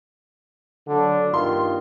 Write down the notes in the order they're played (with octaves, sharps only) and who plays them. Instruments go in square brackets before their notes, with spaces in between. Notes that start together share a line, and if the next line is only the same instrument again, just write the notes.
[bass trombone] D3 [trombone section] F#3 A3 D4
[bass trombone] G2 [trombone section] D#3 A#3 F4 [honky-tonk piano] C6